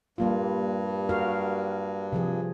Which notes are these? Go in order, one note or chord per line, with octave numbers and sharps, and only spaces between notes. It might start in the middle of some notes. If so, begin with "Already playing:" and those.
G2 G3 A#3 F4
F#4 A#4 F5
C3 F3 G#4